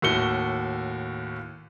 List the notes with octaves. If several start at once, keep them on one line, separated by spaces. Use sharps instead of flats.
D#2 A2 F#4 C#7 G7